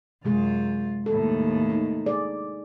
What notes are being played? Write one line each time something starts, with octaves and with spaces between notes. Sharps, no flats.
F#2 C3 G#3 F4 G#4
D#2 A2 A4
D#4
G#4 D5